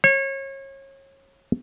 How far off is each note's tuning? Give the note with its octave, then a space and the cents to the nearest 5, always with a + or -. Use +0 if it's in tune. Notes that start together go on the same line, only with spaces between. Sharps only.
C#5 -30